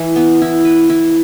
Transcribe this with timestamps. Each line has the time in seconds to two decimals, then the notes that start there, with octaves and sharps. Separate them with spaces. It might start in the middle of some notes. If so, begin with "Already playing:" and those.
Already playing: E3 E4
0.16 B3
0.42 E4
0.65 B4
0.90 E4